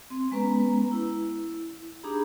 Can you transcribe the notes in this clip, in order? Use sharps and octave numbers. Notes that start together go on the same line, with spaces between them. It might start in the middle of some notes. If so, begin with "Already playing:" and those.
C4
G#3 B3 C#4 B4 A#5
E4
D4 D#4 G4 G#4 A#5 B5